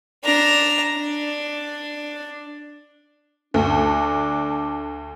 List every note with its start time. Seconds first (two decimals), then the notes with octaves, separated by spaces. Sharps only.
0.24 D4 A#5
0.98 D4
3.54 D2 D4